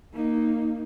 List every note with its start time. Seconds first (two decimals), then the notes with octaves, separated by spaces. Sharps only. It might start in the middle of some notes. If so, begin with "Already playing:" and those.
0.13 A#3 D#4